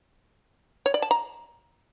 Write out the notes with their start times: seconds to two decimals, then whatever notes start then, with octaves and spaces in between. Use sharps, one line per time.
0.86 C#5
0.94 D5
1.02 A5
1.11 A#5